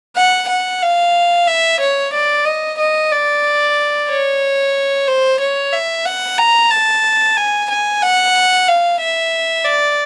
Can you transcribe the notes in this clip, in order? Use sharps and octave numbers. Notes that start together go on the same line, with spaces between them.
F#5
F#5
F5
E5
C#5
D5
D#5
D#5
D5
C#5
C5
C#5
E5
F#5
A#5
A5
G#5
G#5
F#5
F5
E5
D5